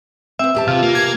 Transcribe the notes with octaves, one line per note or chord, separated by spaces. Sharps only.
B3 C4 E5
E2 G4 A5
C3 F4
A#3
G#6